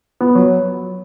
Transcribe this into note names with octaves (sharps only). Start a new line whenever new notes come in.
B3
F#3